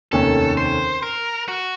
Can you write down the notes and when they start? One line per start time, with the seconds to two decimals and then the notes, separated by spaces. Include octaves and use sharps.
0.12 F1 D#2 D#3 A3 C#4 A4
0.57 C5
1.03 A#4
1.48 F#4